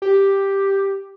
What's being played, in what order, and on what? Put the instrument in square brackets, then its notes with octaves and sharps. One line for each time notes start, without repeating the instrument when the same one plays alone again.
[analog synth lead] G4